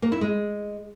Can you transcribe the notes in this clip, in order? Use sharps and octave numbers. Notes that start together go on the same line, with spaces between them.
A#3
E4
G#3